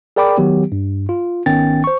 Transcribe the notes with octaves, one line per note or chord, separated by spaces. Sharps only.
G#4 A#4 D5 G5 B5 D6
D#3 F#3 B3 G4
G2
F4
G#1 D#3 B3 C#4 G5 A6
C5 C#6